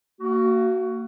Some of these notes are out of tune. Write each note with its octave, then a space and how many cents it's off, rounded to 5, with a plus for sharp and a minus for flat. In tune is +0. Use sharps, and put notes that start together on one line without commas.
A#3 -30 F#4 +15